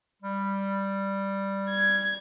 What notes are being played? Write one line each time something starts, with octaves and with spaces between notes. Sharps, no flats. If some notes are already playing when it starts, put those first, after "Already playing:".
G3
G#6